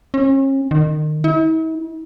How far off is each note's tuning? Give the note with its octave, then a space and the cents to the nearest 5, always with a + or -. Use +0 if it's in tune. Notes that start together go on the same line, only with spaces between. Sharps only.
C#4 -40
D#3 -30
E4 -45